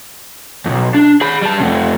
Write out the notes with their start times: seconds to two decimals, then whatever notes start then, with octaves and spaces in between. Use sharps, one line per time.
0.66 B1 F2
0.94 D4
1.21 G#4 B5
1.42 G3 A5
1.60 F2 C3